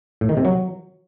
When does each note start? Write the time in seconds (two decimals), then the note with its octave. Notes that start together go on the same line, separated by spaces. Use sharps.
0.21 A2
0.29 D#3
0.37 C3
0.45 F#3